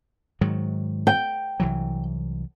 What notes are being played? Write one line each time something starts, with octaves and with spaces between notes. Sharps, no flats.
G#2 D#3 F#3
G5
C2 E3 F#3